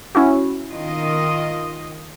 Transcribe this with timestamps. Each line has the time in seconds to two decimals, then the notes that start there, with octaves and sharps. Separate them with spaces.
0.15 C#4 E4 F#4
0.71 D#3 F4 D#5